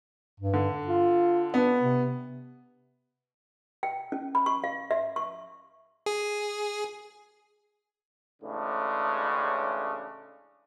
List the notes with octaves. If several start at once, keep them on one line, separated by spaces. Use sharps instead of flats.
G2
D3
F4
B3 D4
C3
G5
C#4
B5
C#6
F5
E5
C#6
G#4
A1 A2 C#3 G#3 D4